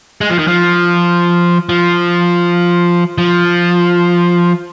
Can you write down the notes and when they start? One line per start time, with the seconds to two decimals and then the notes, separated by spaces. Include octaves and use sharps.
0.21 G#3
0.30 F3
0.39 D#3
0.47 F3
1.69 F3
3.18 F3